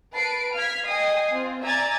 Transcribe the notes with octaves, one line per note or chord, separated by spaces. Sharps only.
B4 A5 C7 D7
F5 F6 G#6 B6
D#5 G5 G#5 D#6 C7
C4 F4
D5 E5 G#5 A#5 G#6 A6